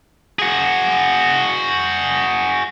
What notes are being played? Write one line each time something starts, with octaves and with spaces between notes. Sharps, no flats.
F#4 G#4